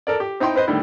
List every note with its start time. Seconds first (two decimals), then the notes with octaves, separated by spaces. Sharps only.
0.07 A4 A#4 D5
0.20 G4
0.40 C4 D#4 E4 G5 C6
0.55 C4 B4 C5 D#5
0.67 A2 D3 D#3 G3